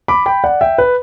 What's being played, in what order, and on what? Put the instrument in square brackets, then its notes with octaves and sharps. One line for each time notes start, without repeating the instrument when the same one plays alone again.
[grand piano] B5 D6
G5 B5
D5 F#5
E5 G5
B4